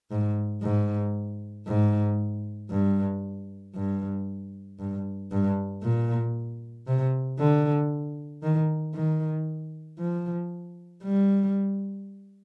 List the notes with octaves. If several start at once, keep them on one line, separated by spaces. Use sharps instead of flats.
G#2
G#2
G#2
G2
G2
G2
G2
A#2
C3
D3
D#3
D#3
F3
G3